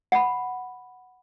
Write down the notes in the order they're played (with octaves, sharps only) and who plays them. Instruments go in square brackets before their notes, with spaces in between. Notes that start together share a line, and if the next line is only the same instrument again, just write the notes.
[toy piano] F#5 B5